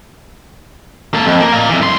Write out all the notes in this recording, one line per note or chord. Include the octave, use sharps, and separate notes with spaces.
A#3 A4
F2
A#3
D5 F5
F2 E3
C2 C6